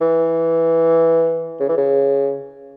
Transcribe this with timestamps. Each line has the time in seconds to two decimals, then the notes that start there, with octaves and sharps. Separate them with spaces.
0.01 E3
1.60 C#3
1.69 E3
1.78 C#3